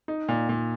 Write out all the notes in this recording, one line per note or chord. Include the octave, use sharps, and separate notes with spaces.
D#4
A#2
A#2